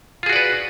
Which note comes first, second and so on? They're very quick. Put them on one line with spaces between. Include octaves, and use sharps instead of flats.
F4 G#4 F#4 D5 B4